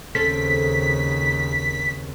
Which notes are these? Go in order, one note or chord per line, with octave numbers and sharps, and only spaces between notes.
D#2 C#3 C4 C#4 A4 B6